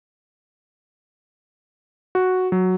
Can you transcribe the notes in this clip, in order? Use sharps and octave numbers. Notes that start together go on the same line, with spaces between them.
F#4
F#3